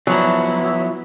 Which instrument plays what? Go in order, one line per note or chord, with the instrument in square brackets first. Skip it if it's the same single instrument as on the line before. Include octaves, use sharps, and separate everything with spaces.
[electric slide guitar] F3 B3 E4 [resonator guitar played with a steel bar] F#3